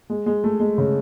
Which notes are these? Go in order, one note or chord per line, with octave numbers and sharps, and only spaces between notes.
G#3
G#3
A3
G#3
C#3